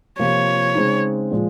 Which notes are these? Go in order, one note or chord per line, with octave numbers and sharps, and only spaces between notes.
C3 F3 A#3 F4 C#5
C#3 G#3 C4 D#4
A#2 F3 G#3